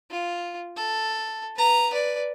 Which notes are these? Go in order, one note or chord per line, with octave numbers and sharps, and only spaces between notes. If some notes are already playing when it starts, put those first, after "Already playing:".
F4
A4
B4 A#5
B4 D5